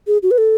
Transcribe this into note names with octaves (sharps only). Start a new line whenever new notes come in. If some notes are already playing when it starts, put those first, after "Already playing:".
G#4
F#4
B4
A4